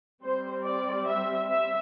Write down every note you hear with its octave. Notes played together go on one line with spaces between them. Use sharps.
G3 C4 C5
D5
E5
E5